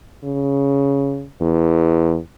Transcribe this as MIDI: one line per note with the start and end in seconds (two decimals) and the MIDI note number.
0.25 1.26 49
1.41 2.18 40